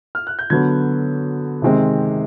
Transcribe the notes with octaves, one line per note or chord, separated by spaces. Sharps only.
F6
F#6
G6
D3 F#3 B3 G#6
C3 D#3 G#3 C4